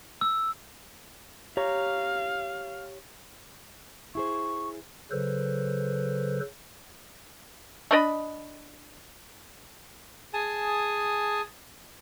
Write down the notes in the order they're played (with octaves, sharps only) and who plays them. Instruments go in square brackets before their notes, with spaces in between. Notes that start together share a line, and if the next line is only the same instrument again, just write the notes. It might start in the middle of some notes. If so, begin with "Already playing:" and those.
[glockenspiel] E6
[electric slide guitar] G4 C#5 A#5 [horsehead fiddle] F5
[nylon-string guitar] E4 G#4 C5 [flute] C#6
[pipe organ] C#3 F#3 A4 B4 C5
[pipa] A3 D4 D#5 B5
[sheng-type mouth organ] G#4 G#5 A5 D#6